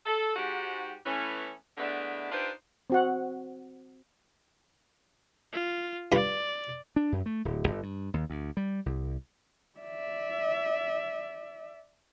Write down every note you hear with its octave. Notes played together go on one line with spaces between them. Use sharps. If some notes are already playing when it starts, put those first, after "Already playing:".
A4
G#2 F#4 G4
E3 A3 B3 C#4
D3 E3 G#3 A3 B3 D4
D4 D#4 F4 G4 B4 C5
C4 F#4 F#5
F4
G2 F4 D5 B5
D4
F#2
A3
D1
G1
G2
D#2
D2
G3
C2
D5 E5